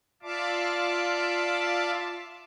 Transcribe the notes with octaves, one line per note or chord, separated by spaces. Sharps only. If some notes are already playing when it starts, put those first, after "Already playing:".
F4 D5 E5 F5 A5 D6